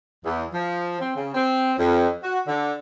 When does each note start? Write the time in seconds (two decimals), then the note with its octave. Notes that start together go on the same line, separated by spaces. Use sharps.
0.25 E2
0.53 F3
1.00 C4
1.15 C#3
1.35 C4
1.79 F2
2.24 F#4
2.47 D3